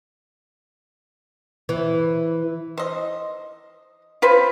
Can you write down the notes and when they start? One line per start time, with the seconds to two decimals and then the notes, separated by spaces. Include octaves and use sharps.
1.69 E3
2.77 C5 D#5
4.22 F4 B4 C5